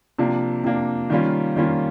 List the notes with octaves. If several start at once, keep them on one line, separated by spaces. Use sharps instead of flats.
C3 F3 A#3 D4
C3 F3 A#3 D4
D#3 G3 A#3 C#4 F4
D#3 G3 A#3 C#4 F4